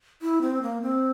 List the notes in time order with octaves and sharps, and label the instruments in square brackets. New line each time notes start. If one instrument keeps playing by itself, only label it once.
[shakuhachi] E4
C4
A#3
C4